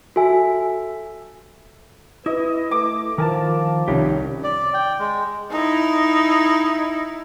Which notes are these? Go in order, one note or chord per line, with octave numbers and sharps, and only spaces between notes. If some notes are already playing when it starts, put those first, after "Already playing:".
F#4 A4 E5 G#5
E4 B4 D#5
A3 D6
D#3 F3 A#4 G#5 A5
C2 D#3 C#4 D#4 G4
D5
G5
G#3
D#4 E4